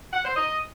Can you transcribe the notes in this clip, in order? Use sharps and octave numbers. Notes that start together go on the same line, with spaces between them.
F#5
C5
D#5